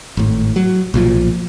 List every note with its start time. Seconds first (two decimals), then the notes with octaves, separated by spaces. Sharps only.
0.17 G#1 A2
0.56 F#3
0.94 B1 A#2 F3